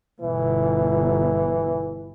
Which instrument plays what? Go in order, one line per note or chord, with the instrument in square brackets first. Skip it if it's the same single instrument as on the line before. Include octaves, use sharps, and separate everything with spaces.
[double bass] G1 B2 [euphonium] E3